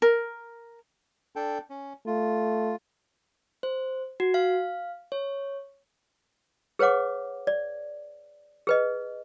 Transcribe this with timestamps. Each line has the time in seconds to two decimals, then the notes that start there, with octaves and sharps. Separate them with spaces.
0.02 A#4
1.36 D4 A4 G5
1.70 C#4
2.07 A3 F4
3.63 C5
4.20 F#4
4.34 F5
5.12 C#5
6.79 G#4 B4 C#5 F#5 D6
7.47 D5
8.67 G#4 B4 D#5